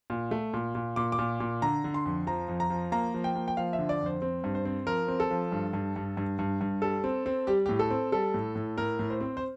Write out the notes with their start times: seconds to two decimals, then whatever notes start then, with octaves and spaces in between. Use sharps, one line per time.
0.10 A#2
0.31 A3
0.54 A#2
0.75 A#2
0.96 A#2 D6
1.12 D6
1.19 A#2
1.40 A#2
1.62 D3 A#5
1.84 D3
1.94 C6
2.05 F2
2.27 F3 A#5
2.48 F2
2.60 A#5
2.70 F3
2.92 A#3 A#5
3.14 F3
3.24 G5
3.35 A#3
3.48 G5
3.57 F3 F5
3.73 E5
3.79 D3
3.89 D5
4.01 F2
4.06 C5
4.22 C4
4.44 G2
4.55 C5
4.65 C4
4.86 F3 A#4
5.08 C4
5.20 A4
5.31 F3
5.52 G2
5.73 G2
5.96 G2
6.17 G2
6.39 G2
6.61 G2
6.82 G3 A4
7.04 C4
7.26 C4
7.47 G3 G4
7.66 A2 G4
7.79 A4
7.90 C4
8.12 G3 A4
8.34 A2
8.55 A2
8.78 A2 A#4
8.99 A2
9.10 C5
9.20 C4
9.37 C5